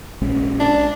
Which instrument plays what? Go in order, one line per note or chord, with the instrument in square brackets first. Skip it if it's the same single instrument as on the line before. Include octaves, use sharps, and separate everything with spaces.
[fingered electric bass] A#1 G#3 C#4
[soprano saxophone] D4